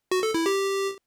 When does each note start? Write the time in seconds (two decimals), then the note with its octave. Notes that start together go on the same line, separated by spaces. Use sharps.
0.11 F#4
0.23 A4
0.34 E4
0.46 G4